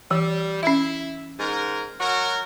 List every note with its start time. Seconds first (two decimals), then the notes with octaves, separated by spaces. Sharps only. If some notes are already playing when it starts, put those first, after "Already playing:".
0.11 E3 G3
0.63 C#4 E4 E5
1.40 G#2 A#4
2.00 F#3 F#4 A#4